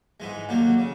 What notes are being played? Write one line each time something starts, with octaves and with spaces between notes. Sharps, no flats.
G#2 E3 G#3
D#2 D3 F#3 A#3
C#3